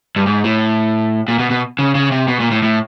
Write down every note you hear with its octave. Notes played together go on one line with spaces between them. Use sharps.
G2
G#2
A2
A#2
B2
B2
C#3
C#3
C3
B2
A#2
A2
A2